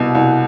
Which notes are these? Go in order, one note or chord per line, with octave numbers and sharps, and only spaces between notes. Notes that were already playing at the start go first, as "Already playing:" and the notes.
Already playing: C2 B2
C2